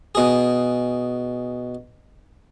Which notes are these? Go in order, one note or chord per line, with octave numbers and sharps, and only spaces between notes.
B2 G#4